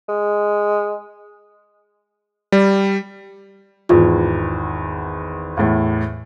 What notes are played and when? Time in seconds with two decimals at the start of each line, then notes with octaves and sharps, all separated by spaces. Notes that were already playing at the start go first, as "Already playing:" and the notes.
0.09 G#3
2.52 G3
3.89 G#1 E2 F4
5.57 E2 A2